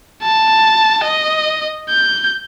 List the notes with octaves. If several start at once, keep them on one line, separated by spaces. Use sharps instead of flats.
A5
D#5
G6